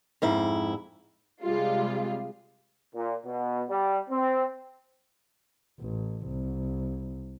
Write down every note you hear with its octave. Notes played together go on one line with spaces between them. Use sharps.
F2 G#2 E4
C3 G3 G#3 F4
A#2
B2
G3
C4
A1
C2